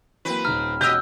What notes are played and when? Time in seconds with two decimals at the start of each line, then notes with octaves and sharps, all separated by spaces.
0.25 E3 F#3 A#3 C4 B4
0.45 D#1 D#4 A#5 F6
0.81 E1 C#4 F#4 G4 D#5 E6 F#6 G6